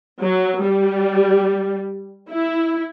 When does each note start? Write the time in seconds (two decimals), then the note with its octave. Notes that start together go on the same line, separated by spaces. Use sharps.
0.21 F#3
0.61 G3
2.30 E4